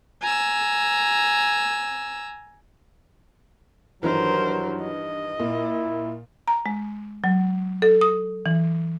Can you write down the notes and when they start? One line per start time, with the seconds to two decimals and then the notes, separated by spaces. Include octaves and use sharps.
0.22 G#5 A#5 E6
4.03 G2 D#3 E3 F#3 A#4 C5
4.81 D#5
5.40 A#2 E4
6.48 A#5
6.66 G#3
7.24 F#3
7.82 A4
8.01 D#6
8.46 E3